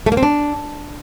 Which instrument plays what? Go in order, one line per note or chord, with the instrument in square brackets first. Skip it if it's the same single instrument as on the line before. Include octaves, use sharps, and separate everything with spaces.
[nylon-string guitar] A3
A#3
C4
D4